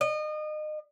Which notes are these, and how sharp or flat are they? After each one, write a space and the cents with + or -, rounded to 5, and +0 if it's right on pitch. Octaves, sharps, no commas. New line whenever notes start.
D#5 -30